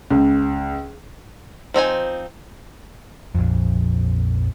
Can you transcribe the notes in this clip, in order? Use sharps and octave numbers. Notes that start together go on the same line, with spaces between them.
C#2
F3 C4 D#4 G#5
A#1 F2